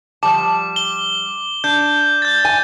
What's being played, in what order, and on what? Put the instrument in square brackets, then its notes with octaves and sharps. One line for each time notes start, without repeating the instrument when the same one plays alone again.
[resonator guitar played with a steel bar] F3 G3 A5 [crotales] D6
[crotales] G7
[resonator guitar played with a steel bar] D4 [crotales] G6
[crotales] G6 A6
[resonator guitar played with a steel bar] G#5